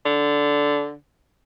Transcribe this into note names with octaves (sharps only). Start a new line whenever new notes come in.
D3